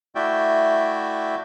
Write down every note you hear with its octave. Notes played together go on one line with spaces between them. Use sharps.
A3 E4 F#4 D5 E5 G5